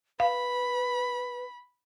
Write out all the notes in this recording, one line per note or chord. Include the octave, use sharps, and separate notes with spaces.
B4 F5 B5